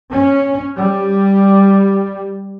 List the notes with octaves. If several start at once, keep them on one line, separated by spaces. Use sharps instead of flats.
C#4
G3